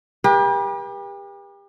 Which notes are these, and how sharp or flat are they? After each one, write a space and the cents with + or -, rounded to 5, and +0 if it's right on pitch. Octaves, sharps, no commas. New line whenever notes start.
G4 +35 B4 -40